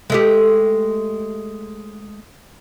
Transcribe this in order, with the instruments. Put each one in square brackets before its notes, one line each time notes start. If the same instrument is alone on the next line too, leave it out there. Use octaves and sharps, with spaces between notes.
[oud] G#3 A3 G4